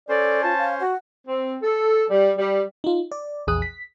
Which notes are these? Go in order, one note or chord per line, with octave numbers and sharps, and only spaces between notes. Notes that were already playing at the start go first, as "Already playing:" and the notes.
C#4 A4 C5 D5
F4 A5
F5
F#4 F#5
C4
A4
G3
G3
D#4 F4
D5
A#1 E2 G#4 D#6 F#6
B6